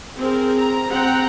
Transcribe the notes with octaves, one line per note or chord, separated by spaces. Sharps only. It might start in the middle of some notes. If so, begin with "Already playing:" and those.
C4 G#4 A#4
A#5
C4 F#5 G5 A#5